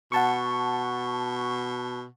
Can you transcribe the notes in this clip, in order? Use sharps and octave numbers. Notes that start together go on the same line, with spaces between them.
B2 F#5 A5 C#6